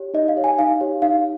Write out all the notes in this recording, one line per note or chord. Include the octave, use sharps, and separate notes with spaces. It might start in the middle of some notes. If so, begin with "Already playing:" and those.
Already playing: G4 C#5
D#4 D#5
F5
G4 C#5
G#5
D#4 F5
G4 C#5
D#4 F5